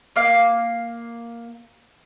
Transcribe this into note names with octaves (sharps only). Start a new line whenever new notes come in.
A#3 F5